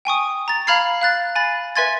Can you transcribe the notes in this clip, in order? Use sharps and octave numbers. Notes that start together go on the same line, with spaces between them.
G5 G#5 C#6 D#6
A#5 A6
F5 A#5 B5 F6 G#6 C7
F5 F#6 A6
G#5 B5 A6
B4 E5 G#5 C6 G#6 A6